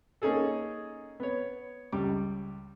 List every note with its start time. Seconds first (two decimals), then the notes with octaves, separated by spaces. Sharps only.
0.22 A#3 C#4 D#4 G#4 A4
1.20 B3 C#5
1.92 C#2 G3 D6